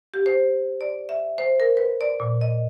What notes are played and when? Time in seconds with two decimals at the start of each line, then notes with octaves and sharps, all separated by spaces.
0.14 G4
0.26 C5
0.81 D5
1.09 E5
1.38 C5
1.60 A#4
1.77 B4
2.01 D5
2.20 A#2
2.41 D#5